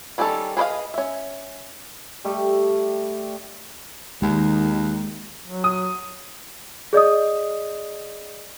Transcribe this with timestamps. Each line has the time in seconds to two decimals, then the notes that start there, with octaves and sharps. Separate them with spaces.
0.18 D#3 G3 C#4 D#4 A4
0.57 G#4 B4 C5 D#5 F5
0.94 C#4 E5
2.25 G3 A3
4.22 D#2 D#3 G#3
5.46 F#3
5.64 D#6
6.93 G#4 D5 D#5 D#6